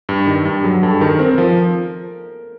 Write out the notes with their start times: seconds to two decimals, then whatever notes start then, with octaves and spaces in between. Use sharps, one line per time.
0.09 G2
0.27 D#3
0.45 G2
0.64 F#3 G#4
0.83 G2 A4
1.01 D#3 A#4
1.19 C4 A#4
1.38 F3